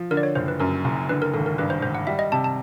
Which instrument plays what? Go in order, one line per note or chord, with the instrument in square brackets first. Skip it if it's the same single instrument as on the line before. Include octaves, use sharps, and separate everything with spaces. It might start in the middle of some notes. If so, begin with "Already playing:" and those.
Already playing: [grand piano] F3
[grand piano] D3 [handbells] A#4
[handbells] D5
C#5
[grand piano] F#1 [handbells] C5
[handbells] B4
[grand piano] F#2 [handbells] A#4
[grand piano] F#1
[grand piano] D3 [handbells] B4
[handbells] A#4
[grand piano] G#1 [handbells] A4
[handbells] A#4
[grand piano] G2 [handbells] B4
[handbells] C5
[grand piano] G#1 [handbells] C5
[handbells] F#5
[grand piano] G3 [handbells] E5
[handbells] D#5
[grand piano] C3 [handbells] A5
[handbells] A5